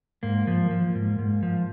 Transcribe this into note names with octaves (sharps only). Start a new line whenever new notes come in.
G#2 A#3
F3
F3
G#2
G#2
F3